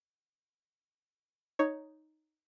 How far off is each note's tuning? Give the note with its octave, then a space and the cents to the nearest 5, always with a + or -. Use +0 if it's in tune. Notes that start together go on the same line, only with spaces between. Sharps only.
D#4 +0 C#5 +0